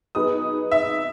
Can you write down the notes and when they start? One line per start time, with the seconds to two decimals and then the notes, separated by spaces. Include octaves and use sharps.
0.15 F#3 B3 D#4 G#4 B4 D#6
0.72 E5